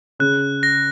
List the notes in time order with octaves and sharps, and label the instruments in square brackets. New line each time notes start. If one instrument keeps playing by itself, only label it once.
[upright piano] C#3 [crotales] F#6
[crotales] A#6